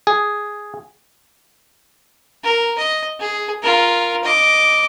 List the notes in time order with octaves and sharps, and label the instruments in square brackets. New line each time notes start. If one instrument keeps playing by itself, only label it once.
[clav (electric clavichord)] G#4
[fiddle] A#4
D#5
G#4
F4 A#4
D#5 D6